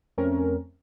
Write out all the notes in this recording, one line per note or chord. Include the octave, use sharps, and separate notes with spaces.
F2 A3 C4 C#4 A#4